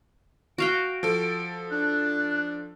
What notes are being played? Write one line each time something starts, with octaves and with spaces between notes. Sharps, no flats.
F#4 F5 G5 D7
F3 A4
D4 F#6